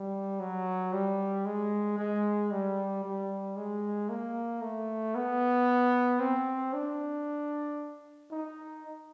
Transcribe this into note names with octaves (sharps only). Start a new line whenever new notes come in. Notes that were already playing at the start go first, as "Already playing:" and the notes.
Already playing: G3
F#3
G3
G#3
G#3
G3
G3
G#3
A#3
A3
B3
C4
D4
D#4